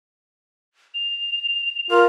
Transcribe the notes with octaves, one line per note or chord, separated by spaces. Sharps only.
F7
F4 A#4